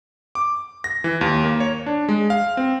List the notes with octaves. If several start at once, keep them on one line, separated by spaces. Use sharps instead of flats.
D6
A#6
E3
D#2
A#3
C#5
D4
G#3
F5
C4